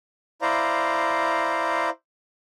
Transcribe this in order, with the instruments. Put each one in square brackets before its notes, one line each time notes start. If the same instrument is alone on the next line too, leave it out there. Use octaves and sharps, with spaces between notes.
[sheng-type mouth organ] E4 C5 D5 F5 A#5